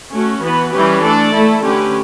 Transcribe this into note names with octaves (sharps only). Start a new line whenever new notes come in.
A3 C#4 F#4
E3 B3 F#4 B4
E3 G3 C#4 G4 B4
A3 D4 A4 D5
A3 E4 A4
D3 A3 C#4 G4 B4